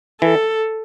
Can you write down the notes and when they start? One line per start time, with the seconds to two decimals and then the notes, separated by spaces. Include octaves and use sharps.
0.21 E3 A4